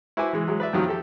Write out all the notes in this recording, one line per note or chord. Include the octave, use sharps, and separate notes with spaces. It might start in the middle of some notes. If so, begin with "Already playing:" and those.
E4 F#4 B4 C5 G#5 D6
E3 G#3
F#3 G#3
B4 D5 E5
F2 B2 D#3 F#3 G3
G4 A4